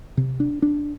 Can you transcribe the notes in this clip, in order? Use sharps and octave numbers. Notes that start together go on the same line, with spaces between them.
C3
D4
D4